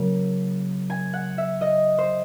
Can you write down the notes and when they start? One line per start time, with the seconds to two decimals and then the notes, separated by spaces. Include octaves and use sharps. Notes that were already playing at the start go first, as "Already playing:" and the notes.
Already playing: C#3 F#3 A#3
0.90 G#5
1.13 F#5
1.38 E5
1.61 D#5
1.98 C5